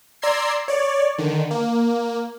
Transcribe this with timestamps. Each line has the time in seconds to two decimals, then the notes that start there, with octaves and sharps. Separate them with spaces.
0.22 D5 A#5 C6 E6 G#6 C7
0.68 C#5 D5
1.18 D3 D#3
1.51 A#3